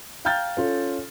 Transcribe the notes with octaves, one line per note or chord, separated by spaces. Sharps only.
F5 G5 A#5 F6 G6 A6
C#4 F4 A4